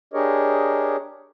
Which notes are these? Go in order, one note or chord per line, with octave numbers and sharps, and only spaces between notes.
D4 G4 G#4 A#4 C#5 D#5